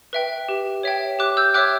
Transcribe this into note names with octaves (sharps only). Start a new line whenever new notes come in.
B4 E5 G5
G4
C#5 E5 G5
G4 D6 F#6
E6 G6
C#5 E5 G5 D6 F#6